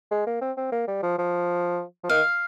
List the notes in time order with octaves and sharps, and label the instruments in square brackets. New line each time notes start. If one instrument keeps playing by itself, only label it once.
[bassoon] G#3
A#3
C4
C4
A#3
G3
F3
F3
F3
[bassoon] D#3 [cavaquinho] F5